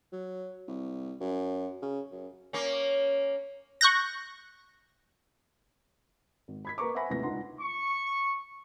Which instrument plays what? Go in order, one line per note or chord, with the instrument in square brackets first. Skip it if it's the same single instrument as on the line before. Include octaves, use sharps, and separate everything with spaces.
[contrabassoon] F#3
C2
F#2
C#3
F#2
[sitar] A#3 C#4
[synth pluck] C#6 F#6 G6 A#6
[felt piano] G#1
B5 G#6 B6
A#3 B4 A#5 C#6 D6
C5 E5 F#5 G#5 B5 A#6
D#1 A2 C3 B4 A#6
C#2 D4 D#4 F#5 C6
[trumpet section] C#6